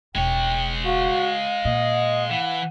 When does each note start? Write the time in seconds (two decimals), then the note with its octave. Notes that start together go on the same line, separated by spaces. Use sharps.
0.15 E1 G#3 C#5 G5
0.85 F#4 F5
1.65 A#2 D#5
2.31 E3 F#5